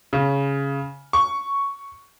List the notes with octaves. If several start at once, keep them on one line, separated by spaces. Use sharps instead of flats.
C#3
C#6